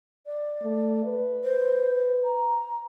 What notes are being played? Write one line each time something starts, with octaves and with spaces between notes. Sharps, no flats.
D5
A3
B4
C5
A#5